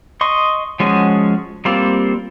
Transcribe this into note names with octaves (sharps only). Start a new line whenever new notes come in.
D#5 C6 C#6
F3 G#3 C#4 F#4
G3 A#3 C4 F4